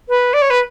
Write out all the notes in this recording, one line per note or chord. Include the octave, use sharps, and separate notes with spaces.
B4
D5
C#5
B4